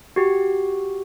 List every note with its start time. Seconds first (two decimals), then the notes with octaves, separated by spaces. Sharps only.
0.16 F#4 G4